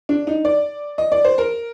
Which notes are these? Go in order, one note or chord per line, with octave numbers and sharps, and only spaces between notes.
D4
D#4
D5
D#5
D5
C5
A#4